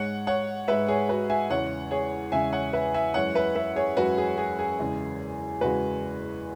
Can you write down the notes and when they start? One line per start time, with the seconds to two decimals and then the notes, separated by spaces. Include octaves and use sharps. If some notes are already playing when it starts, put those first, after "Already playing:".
Already playing: G#2 G#3 C#5 F#5
0.27 C#5 F#5
0.68 G#2 G#3 B4 E5
0.88 G#4 C#5
1.09 F#4 B4
1.30 E5 G#5
1.50 E2 C#3 G#3 C#5 F#5
1.91 G#4 C#5
2.32 E2 C#3 G#3 E5 G#5
2.53 C#5 F#5
2.73 B4 E5
2.94 E5 G#5
3.14 F#2 E3 G#3 C#5 F#5
3.35 B4 E5
3.56 B4 E5
3.76 G#4 C#5
3.97 F#2 E3 G#3 F#4 B4
4.18 G#4
4.38 G#4
4.59 G#4
4.79 E2 C#3 G#3
5.61 E2 C#3 G#3 F#4 B4